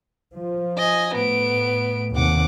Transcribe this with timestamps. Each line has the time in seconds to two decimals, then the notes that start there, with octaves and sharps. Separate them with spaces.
0.33 F3
0.78 D#5 G#5
1.15 A2 B3 D7
2.16 D#2 C3 F#5 D6